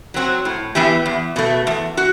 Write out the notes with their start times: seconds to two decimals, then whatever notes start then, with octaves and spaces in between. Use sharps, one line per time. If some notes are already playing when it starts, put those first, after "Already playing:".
0.14 F#3 C4 F#4
0.45 A2
0.75 E3 B3 E4 G4
1.06 E2
1.36 B2 A3
1.67 E2
1.97 F#4